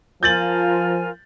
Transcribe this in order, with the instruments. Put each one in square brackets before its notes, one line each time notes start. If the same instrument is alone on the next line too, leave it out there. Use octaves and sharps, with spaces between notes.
[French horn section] F3 [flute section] F4 A#4 G#5 [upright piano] G6 A6 F#7